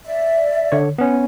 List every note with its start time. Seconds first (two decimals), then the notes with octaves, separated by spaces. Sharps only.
0.04 D5 E5
0.72 D3 C#5
0.98 B3 C#4